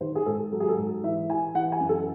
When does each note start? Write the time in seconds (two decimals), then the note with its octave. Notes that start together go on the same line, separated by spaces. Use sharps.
0.01 D#3 C5
0.15 G#4
0.26 G#2 A4
0.52 F#3 A4
0.60 G#4
0.69 A4
0.77 G#2
1.03 E3 E5
1.29 E3 G#5
1.55 E3 F#5
1.72 G#5
1.80 F#2
1.89 A4